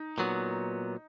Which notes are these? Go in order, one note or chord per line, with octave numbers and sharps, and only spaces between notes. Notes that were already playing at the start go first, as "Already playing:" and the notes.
Already playing: D#4
A#2 F#3 B3